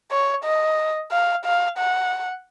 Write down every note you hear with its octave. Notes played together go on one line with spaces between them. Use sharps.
C#5
D#5
F5
F5
F#5